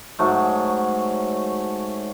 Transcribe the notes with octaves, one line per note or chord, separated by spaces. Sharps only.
G#2 F#3 A3